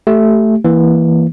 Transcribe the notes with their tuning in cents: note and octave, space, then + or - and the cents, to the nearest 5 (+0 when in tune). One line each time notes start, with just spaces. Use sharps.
A3 +0 G4 -15
E3 +0 A#3 +0